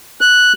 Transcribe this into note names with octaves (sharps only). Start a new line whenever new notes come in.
F#6